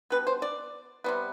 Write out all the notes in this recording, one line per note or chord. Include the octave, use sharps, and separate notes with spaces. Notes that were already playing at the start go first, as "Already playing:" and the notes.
B2 G3 B3 B4
C5
D5
C3 G3 B3